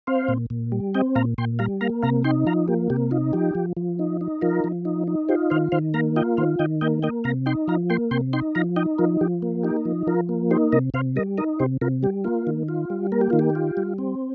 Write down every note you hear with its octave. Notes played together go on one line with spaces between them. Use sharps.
C4 C5 F5
A#2
A#2
G3
C4 D#5 G5
A#2 F5 A#5
A#2 G5 C6
G3 F5 A#5
A#3 F5 A#5
C3 F5 A#5
D#4 G5 C6
F3 F5 A#5
A#3 G4
C3 G4
D#4 F4
F3 G4
F3
F3
D#4
D#4
F3 F4 A#4
F3
D#4
D#4
F4 G4 C5
D#3 C5 F5
D#3 C5 F5
A#3 F5 A#5
F4 D#5 G5
D#3 C5 F5
D#3 D#5 G5
A#3 D#5 G5
A#3 D#5 G5
C3 F5 A#5
D#4 G5 C6
F3 F5 A#5
A#3 G5 C6
C3 G5 C6
D#4 G5 C6
F3 F5 A#5
D#4 D#5 G5
F3 F4 A#4
F3 G4
A#3
D#4 G4
F3
F3 F4 A#4
A#3
D#4 G4 C5
C3 A#4 D#5
C3 C5 F5
G3 A#4 D#5
D#4 A#4 D#5
C3 G4 C5
C3 F4 A#4
G3 G4
A#3 F4
D#3
F4
G3
A#3 A#4
G4
D#3 F4
G4
F4
G3
C4